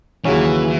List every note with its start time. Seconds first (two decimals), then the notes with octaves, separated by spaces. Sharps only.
0.25 D#2 C#3 E3 F#3 C#4